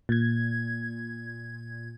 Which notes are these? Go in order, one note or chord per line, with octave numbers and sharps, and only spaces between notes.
A#2 G#6